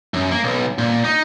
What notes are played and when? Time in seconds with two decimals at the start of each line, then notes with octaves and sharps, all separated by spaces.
0.14 F#2
0.31 A#3
0.44 B1
0.78 A#2
1.04 D#4